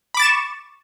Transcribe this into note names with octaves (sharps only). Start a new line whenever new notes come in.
B5 C#6 D6 A6 E7